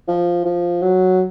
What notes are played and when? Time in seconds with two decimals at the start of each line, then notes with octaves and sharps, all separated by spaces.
0.08 F3
0.45 F3
0.82 F#3